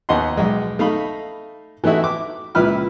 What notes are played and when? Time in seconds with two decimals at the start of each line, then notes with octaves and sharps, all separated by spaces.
0.09 D#2 B3 D#5 F#5 C6
0.37 B1 G#3
0.79 A3 D#4 F5 B5
1.84 E3 A3 D#4 E4 F#4
2.04 D6
2.55 C#2 A#2 E4 B4 B5 F6